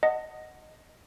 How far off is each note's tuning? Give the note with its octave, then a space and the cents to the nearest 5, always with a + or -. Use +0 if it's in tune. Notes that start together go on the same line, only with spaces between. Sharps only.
D#5 +0 F#5 +0 A5 +30